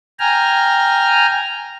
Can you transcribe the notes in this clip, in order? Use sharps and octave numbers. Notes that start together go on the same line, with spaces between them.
G5 G#5 A#5 F6